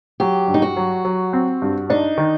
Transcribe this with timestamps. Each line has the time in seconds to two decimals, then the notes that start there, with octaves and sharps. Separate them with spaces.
0.20 F#3 G4
0.48 G2
0.54 D#4
0.62 F#4
0.76 F#3
1.05 F#3
1.33 C4
1.62 G2
1.90 D4 D#4
2.18 D#3